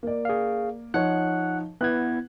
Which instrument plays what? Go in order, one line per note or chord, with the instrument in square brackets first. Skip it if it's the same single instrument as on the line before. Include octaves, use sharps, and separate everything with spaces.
[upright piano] A#3 D5
[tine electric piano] G#4 F5
[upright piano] F3 D#4 C#5 [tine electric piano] F#5 F#6
[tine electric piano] B3 E4 G#6 [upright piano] B4 F#5 F#6